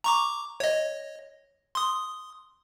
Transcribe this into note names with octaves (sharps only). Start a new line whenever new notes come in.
A#5 C#6 D6
C#5 D#5
C6 D#6